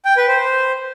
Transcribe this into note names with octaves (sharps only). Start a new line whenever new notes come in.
G5
B4
C5